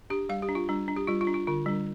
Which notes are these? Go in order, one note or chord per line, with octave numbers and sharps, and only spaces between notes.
D4 G4
G3 F5
G4
D4
F4
G3 D4
D4
G4
G3 F4
F4
D4
F4
D3 F4
G3 D4